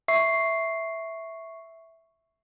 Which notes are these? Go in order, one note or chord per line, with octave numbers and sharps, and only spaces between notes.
E5 C#6 C7